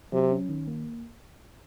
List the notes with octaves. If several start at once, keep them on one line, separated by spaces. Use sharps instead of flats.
C3 F#3
C#4
D#3
A#3